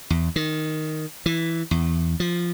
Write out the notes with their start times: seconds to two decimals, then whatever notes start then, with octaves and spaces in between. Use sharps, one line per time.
0.10 E2
0.36 D#3
1.26 E3
1.71 E2
2.20 F3